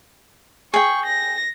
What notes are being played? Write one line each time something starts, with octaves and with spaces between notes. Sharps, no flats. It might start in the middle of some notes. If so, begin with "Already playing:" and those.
G#4 G5 C#6
A#6